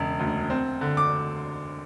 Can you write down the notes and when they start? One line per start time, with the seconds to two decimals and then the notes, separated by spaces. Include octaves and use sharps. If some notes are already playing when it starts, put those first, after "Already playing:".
Already playing: E1 C#3
0.19 D2
0.50 C4
0.81 D3
0.97 D6